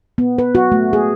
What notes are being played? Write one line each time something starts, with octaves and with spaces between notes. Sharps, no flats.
B3
B4
F#4
A3
G#4